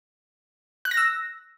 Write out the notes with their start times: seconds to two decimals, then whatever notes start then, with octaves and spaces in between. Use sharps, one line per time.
0.85 F#6
0.91 A#6
0.97 E6